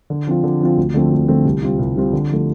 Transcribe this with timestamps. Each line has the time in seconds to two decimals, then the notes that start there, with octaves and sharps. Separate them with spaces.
0.10 D3
0.27 F3 C4 F4
0.44 D3
0.61 F3 C4 F4
0.77 D2
0.94 D3 F3 A3 C4
1.12 D2
1.28 D3 F3 A3 C4
1.45 C2
1.63 C3 G3 C4 F4
1.79 C2
1.96 C3 G3 C4 F4
2.13 D3
2.29 F3 A3